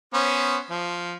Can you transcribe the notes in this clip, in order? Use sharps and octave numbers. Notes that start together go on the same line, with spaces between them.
B3 C#4 C5
F3